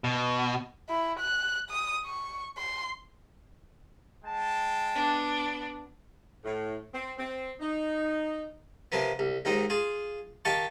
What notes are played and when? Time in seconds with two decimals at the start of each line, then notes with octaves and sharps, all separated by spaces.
0.04 B2
0.89 E4
1.20 F#6
1.70 D#6
2.06 C#6
2.58 C6
4.24 G#3 G5 A5
4.95 B3 D4
6.45 A2
6.94 C4
7.18 C4
7.60 D#4
8.92 C3 F3 A#3 B3
9.19 C2
9.45 D#2 G#2 C4 D#4
9.70 F4 G#4
10.45 D#3 G4 F5 A5 C#6